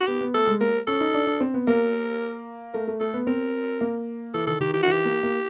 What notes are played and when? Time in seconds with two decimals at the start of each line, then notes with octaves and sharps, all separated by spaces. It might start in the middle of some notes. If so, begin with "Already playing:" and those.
0.01 F#4
0.07 B3 G4
0.21 B3
0.34 A3 A4
0.47 G#3
0.61 A#3 A#4
0.87 C#4 A4
1.01 D#4
1.14 D4
1.27 D4
1.40 C4
1.54 B3
1.67 A#3 A#4
2.74 A3 A#4
2.87 A3
3.00 A3 A4
3.14 B3
3.27 C4 A#4
3.81 A#3
4.34 E3 A4
4.47 D#3 A4
4.60 D#3 G4
4.73 E3 G4
4.83 F#4
4.87 E3 G4
5.05 A#3
5.23 A#3